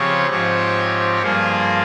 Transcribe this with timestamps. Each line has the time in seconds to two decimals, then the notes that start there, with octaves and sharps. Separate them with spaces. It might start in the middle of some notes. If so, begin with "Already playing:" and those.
Already playing: C#3 F3 C4 G4 C#5
0.29 G#2 F3 C4 G4 C#5
1.22 G2 F3 A#3 F4 G#4